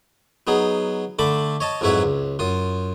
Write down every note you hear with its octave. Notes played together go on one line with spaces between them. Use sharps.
F#3 B3 D#4 G#4
D3 A3 A5 B5 D6
C#5 D#5 A5
F2 G#2 F#3 E4 B4 C#5
C#2
F#2 F4 D#6